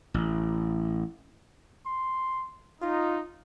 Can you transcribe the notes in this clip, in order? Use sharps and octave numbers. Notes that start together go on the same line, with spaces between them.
A1
C6
D#4 F4